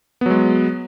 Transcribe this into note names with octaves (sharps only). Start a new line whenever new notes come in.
F#3 G#3 B3